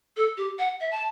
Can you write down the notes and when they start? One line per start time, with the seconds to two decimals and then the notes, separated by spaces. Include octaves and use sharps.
0.17 A4
0.37 G4
0.59 F#5
0.81 E5
0.91 A5